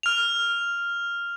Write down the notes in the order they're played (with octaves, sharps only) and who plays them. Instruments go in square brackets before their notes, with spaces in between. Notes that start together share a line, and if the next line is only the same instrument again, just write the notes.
[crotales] F6 F7